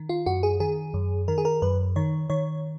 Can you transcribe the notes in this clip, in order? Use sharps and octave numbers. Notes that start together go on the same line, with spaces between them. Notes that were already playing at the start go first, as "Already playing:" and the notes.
Already playing: D#3
F4
F#2 F#4
G#4
D#3 G#4
F#2
D#3 A#4
G#4
A#4
F#2 B4
D#3 C#5
D#3 C#5